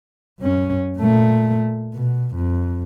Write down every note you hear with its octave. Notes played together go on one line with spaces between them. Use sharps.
F#2 C#4
A#2 A3
B2
F2